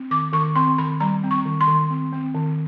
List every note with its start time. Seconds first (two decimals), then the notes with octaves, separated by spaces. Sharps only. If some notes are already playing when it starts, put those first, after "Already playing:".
Already playing: C4
0.11 D#3 D6
0.33 D#3 C#6
0.55 C4 C6
0.78 D#3 B5
1.00 G3 A#5
1.23 C4
1.31 C#6
1.46 D#3
1.61 C6
1.68 D#3
1.90 C4
2.13 C4
2.35 D#3